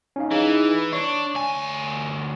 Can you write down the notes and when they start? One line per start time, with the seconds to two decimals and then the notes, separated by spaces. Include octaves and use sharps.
0.16 C#4 D#4 F5
0.31 E3 D#4 G#4
0.93 D4 C#5 C#6
1.35 D2 G#5